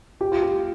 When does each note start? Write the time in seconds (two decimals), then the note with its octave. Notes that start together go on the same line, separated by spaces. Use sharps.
0.21 G4
0.32 F4
0.43 G4